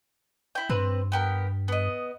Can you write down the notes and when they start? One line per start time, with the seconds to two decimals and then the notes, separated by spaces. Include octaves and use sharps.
0.55 E4 G5
0.69 G2 C4 B4
1.12 B3 G4 A#4
1.68 B3 D#5